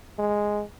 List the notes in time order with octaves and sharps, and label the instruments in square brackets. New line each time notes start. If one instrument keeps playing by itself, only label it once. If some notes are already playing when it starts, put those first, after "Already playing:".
[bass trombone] G#3